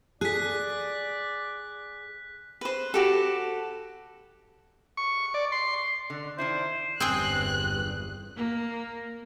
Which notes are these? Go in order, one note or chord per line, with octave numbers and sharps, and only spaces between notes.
G#4 D5 F#6 B6
B4 C5
F#4 G4 A4
C#6
D5
C6
D3
D#3 D4 E4 C5
G1 E2 G2 C4 G#4 G5 F#6
A#3